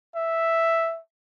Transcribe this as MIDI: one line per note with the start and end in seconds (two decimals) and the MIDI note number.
0.16 0.99 76